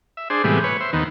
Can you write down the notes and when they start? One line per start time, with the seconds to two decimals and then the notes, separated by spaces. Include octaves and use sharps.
0.17 E5
0.30 D4 G#4 C5
0.44 A2 C3 E3 G3 G#3 B3
0.64 B4 C#5
0.81 C5 E5
0.93 D#2 D#3 B3